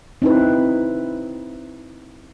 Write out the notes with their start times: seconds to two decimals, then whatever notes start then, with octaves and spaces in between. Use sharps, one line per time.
0.22 C4 D#4 E4 B4